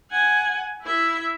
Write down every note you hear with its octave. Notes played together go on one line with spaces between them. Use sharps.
F#5 G#5
E4 E5